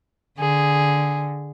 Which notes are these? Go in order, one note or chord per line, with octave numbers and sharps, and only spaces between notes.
D3 G#4